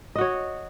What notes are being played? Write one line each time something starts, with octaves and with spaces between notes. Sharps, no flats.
F#4 C#5 D#5